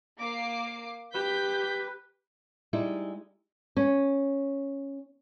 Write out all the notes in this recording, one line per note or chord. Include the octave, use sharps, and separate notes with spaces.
A#3 D6 C7
G4 B4 G6 B6
G3 G#3 D#4 E4
C#4